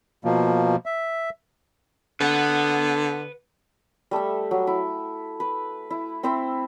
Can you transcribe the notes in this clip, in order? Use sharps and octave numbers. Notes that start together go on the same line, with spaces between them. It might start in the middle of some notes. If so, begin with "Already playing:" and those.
B2 F3 A#3
E5
D3 B4 F#5
G3 A3 A4 E5
F#3
E4
B4
E4
C4 E4 C5 E5